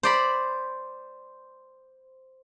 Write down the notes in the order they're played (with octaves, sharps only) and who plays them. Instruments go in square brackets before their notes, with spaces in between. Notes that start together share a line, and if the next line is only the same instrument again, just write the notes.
[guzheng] C5 D5 B5